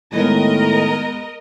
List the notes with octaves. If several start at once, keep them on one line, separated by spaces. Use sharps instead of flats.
A2 D#3 G#3 B3 A#4 D#5